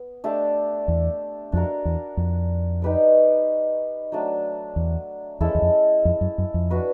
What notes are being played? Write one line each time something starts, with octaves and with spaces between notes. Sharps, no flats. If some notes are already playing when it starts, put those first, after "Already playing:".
Already playing: B3
A3 D4 G4
E2
F2 D4 F#4 A#4
E2
F2
D#4 G4 B4 D5
F#3 A3 D4
E2
E2 G#3 C#4 E4 A4
E2
F2
F2
F#2
F#2
F2
D4 F#4 B4